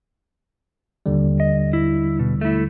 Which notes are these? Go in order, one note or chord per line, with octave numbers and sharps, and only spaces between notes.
D#2 D3 G3
D#5
E4
B2
A3 E4